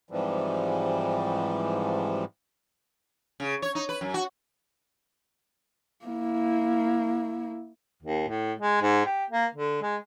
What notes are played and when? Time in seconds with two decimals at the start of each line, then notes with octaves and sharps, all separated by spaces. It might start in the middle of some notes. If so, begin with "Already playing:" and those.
0.11 G#2 C3 E3 F3 G3
3.40 C#3
3.62 C#5
3.75 D#4
3.89 B4
4.01 F#2
4.14 F#4
6.06 A#3 E4
8.03 D#2
8.28 A2
8.58 G#3
8.82 G#2
9.06 G4
9.30 A#3
9.55 D3
9.82 G#3